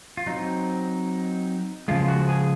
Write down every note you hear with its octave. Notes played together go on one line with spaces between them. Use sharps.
F4
F#3 C4 D#4
C#3 F3 G#3 F4
F#4
G#4